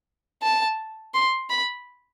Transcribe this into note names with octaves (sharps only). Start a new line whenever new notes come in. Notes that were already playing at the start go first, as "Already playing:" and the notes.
A5
C6
B5